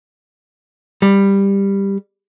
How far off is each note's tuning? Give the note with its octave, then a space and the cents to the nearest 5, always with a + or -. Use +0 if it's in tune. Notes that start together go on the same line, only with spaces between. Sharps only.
G3 +10